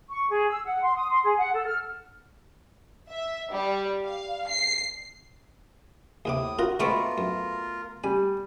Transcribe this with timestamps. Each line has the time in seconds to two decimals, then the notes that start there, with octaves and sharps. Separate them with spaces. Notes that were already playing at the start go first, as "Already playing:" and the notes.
0.11 C#6
0.30 G#4
0.49 E6
0.65 F#5
0.83 C6
0.96 D#6
1.10 C6
1.24 G#4
1.38 F#5
1.53 A4
1.66 F6
3.10 E5
3.52 G3
4.05 F5
4.47 C7
6.25 D#2 A2 C3 D6 D#6
6.59 F4 F#4 A#4 A#5
6.80 B2 G#3 A3 B3 C4 F4 A#4 D5
7.18 F#2
8.04 G3 G#5